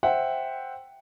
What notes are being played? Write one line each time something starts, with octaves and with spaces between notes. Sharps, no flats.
C5 E5 F#5 G5